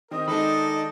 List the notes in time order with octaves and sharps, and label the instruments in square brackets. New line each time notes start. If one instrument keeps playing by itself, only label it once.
[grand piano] D#3 C4 [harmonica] A#4 [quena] D#5
[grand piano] D#3 G#3 [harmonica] D4 A4 [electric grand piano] D#4 B5